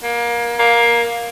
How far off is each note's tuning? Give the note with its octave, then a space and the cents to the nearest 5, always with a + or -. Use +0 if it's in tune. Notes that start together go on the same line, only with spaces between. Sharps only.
A#3 +25
A#3 +15